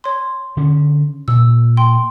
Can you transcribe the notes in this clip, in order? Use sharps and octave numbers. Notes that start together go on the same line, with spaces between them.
C#5 C6
D3 C#4
A#2 E6
G5 C6